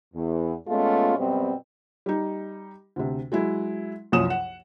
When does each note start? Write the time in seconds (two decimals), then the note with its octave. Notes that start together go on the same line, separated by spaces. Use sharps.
0.14 E2
0.68 A#2 G#3 A3 B3 C#4 F4
1.18 F#2 B2 G3 B3 C4
2.06 G3 D#4
2.96 D2 C3
3.32 F#3 G#3 E4
4.12 C2 F#2 F3 C#5 D#6 E7
4.30 F#5